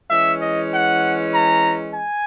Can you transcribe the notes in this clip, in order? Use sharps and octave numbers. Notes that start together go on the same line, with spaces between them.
E3 G#3 C#4 E5
D#5
F#5
A#5
G#5